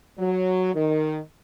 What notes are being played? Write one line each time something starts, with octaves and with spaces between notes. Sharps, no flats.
F#3
D#3